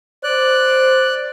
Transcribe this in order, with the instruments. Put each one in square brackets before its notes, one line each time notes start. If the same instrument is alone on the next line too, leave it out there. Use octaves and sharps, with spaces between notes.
[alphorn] C5 [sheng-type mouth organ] D5 F#6